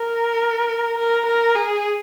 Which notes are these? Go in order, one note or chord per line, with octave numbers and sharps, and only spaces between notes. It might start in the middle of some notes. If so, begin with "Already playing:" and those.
Already playing: A#4
A#4
A#4
G#4